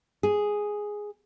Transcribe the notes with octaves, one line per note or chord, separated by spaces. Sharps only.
G#4